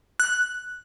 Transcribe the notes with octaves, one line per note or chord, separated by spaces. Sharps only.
F#6